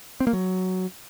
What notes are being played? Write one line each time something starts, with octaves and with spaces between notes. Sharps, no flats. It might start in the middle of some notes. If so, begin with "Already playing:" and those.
C4
A#3
F#3